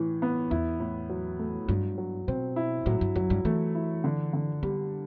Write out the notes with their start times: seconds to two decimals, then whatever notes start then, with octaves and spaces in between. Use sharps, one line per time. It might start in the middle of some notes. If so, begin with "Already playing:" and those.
Already playing: A2 E3
0.22 B3
0.51 E2 E4
0.80 A2
1.09 F#3
1.39 A3
1.68 G2 F#3
1.98 F#3
2.28 B2 C4
2.56 E4
2.86 A2 F#3
3.01 G2
3.16 F#2 F#3
3.30 G2
3.45 E3 A3
3.75 E4
4.04 D3
4.33 D3
4.63 G3 B3